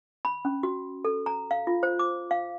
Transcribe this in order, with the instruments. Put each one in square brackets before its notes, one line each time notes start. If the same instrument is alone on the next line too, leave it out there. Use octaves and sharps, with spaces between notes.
[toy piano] B5
C#4
F#4
A4
A#5
F5
F4
C5
D6
F5